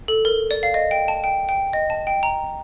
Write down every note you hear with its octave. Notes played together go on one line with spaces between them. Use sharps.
A4
A#4
D5
F5
D#5
G5
A5
G5
G5
D#5
A5
G5
A#5